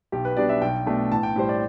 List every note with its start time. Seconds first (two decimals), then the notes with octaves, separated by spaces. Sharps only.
0.12 B1 G4
0.25 B4
0.37 B2 G3 D4 D5
0.49 E5
0.61 B1 G5
0.86 B2 A3 D4
1.11 A1 A5
1.23 G5
1.36 A2 G3 C5
1.49 D5